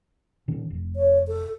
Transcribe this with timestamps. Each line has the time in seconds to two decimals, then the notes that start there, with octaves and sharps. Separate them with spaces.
0.48 A#2 D#3 C#4
0.70 F1
0.96 C#5
1.27 A4